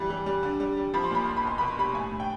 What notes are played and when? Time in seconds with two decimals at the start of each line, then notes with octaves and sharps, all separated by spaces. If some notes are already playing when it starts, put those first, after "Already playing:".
Already playing: E3 G3
0.10 G3
0.26 G3
0.43 D3
0.60 G3
0.77 G3
0.94 F3 B5
1.04 C6
1.11 A#2 B5
1.25 A#2 C6
1.37 B5
1.44 B2 C6
1.58 B2 B5
1.68 C6
1.78 G3 B5
1.94 A2 G#5
2.11 A2
2.20 G5